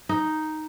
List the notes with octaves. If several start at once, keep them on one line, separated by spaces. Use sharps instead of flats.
D#4